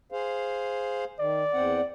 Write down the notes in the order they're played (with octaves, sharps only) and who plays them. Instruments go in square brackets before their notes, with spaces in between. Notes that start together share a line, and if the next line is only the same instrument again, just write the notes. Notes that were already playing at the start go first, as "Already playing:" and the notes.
[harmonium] G#4 C5 F5
[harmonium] D#3 [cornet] D5
[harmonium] E2 C4 F#5